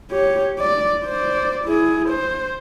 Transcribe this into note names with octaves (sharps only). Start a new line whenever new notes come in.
G4 C#5
D5
C5 D5
E4 G#4
C5